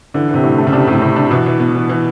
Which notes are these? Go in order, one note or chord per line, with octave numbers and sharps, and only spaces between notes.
D3 E3
C3 E3
A2
A3
C#3
C3 D4
A2 C3
A2 C3
D4
B2 E3
E3
B3
E3
E3